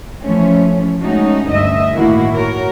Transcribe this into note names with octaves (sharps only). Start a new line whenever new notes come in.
E3 F3 A3 C#4
G#3 A3 C#4 D#4 F#4
D2 G2 D#5 E5
A2 D#3 A#3 E4 F#4
F#4 A#4 C#5